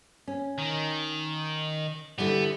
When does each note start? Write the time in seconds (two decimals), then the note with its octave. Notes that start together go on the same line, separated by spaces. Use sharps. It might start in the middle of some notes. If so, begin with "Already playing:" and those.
0.28 C#4
0.58 D#3
2.18 D3 E3 G3 B3